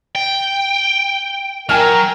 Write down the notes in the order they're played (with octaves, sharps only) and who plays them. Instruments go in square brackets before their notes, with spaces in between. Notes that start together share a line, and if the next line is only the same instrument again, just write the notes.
[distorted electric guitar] G5
[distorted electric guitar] F#3 [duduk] A#4 [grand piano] G5 G#5 F6